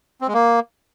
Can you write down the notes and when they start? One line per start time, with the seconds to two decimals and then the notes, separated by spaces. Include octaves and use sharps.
0.21 C4
0.27 G#3
0.34 A#3